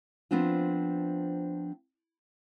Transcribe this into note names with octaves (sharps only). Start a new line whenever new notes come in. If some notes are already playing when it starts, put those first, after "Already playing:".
F3 B3 C4 D4 F4